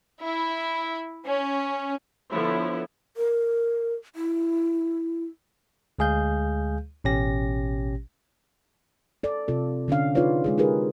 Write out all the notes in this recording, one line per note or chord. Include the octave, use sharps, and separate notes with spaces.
E4
C#4
D3 F3 B3 E4 C#5
A#4
E4
D2 G#3 G#4 F5 G6
A1 B2 C#4 G4 A#6
A4 D5
C3 F4 A4
D3 C#4 D4 F5
D#4 F4 G#4 B4 C#5 D5
G#3 F4 G#4
D#4 F4 G4 G#4 A#4 B4